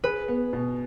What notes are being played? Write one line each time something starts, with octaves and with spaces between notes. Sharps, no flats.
G#4 B4
B3
B2